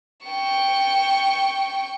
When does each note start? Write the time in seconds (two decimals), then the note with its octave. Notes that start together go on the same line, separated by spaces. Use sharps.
0.26 G5 C#6